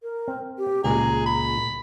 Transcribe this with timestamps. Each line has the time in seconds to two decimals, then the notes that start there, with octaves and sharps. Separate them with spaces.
0.03 A#4
0.28 C4
0.58 G4
0.84 C#2 A#2 G#3 G#4 A#5
1.26 B5